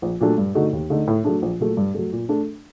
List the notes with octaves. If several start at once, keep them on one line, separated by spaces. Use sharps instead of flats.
A#1
A#2 F#3 A3 D4
G2
D3 A3 D#4 F#4
D#2
D3 A3 D#4
A2
F#3 A3 D4
A#1
A#2 F#3 A3
G2
F#3 A3
A#2
A3 D4